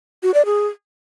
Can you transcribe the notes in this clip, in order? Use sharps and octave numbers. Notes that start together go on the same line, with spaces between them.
F#4
D5
G#4